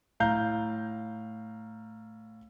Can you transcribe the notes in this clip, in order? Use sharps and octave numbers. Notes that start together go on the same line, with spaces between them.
A2 F5 A#5 G6